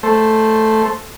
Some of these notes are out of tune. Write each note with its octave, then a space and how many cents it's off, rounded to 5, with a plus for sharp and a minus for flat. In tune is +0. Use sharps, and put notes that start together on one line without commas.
A3 +0 C5 +0